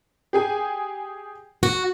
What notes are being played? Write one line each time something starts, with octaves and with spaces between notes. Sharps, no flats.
G4 G#4 G#5
F#4